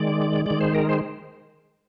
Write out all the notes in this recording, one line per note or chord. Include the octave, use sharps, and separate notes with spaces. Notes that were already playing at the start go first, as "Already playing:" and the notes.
Already playing: D#3 G#3 D5
D#3 G#3 D5
C5
A#4
C5